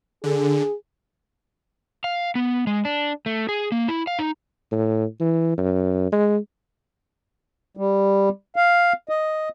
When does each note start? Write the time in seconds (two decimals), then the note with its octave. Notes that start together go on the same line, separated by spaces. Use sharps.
0.24 D3 G#4
2.04 F5
2.35 B3
2.67 G#3
2.85 D4
3.26 A3
3.49 G#4
3.72 A#3
3.88 E4
4.07 F5
4.19 D#4
4.72 A2
5.20 E3
5.58 F#2
6.12 G#3
7.77 G3
8.56 F5
9.09 D#5